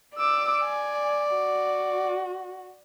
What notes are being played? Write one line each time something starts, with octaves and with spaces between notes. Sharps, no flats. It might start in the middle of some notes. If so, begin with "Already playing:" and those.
D5 D6 E6
G#5
F#4